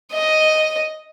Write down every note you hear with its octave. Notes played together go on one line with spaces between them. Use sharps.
D#5